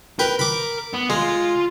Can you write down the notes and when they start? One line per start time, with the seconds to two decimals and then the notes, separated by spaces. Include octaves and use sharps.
0.19 A#4 B4 G5
0.39 B5 D6
0.93 B3
1.10 G#3 F4 F5